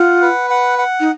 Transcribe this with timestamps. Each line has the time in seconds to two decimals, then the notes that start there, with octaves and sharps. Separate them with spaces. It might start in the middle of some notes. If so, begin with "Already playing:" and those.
Already playing: F4 F#5
0.22 B4
0.50 F#5
0.79 F#5
1.00 D#4